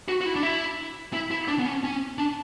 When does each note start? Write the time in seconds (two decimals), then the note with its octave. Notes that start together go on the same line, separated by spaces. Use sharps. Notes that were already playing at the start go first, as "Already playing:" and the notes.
0.08 F#4
0.21 F#4
0.26 E4
0.36 D4
0.43 E4
1.13 E4
1.31 E4
1.48 D4
1.59 B3
1.66 C#4
1.84 C#4
2.18 D4